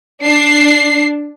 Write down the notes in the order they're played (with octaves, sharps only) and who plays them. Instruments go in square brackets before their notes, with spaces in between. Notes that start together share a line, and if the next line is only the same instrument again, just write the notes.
[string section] D4 C7